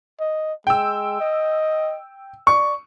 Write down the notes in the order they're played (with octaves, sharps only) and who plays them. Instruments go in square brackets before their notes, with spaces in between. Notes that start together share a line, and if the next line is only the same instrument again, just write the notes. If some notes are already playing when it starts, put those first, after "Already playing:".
[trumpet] D#5
[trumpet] G#3 [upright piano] G5 E6
[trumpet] D#5
[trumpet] D5 [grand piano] C#6